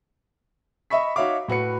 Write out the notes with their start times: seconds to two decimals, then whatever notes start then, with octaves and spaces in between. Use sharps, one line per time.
0.90 D#5 E5 B5 C#6 B6
1.16 D#4 F#4 C#5 E5 F5 D6
1.48 A2 F#4 B4 C#7